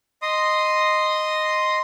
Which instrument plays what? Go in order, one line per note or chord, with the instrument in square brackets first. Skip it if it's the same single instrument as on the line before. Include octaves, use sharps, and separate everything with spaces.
[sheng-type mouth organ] D#5 C6 D#6